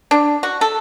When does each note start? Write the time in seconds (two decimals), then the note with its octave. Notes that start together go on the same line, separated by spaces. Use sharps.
0.11 D4
0.43 F#4
0.61 A4